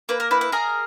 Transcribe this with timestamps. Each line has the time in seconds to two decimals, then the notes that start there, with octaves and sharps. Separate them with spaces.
0.09 A#3 B4
0.20 A#4
0.31 E4 B4
0.41 B4
0.52 G#4 A#4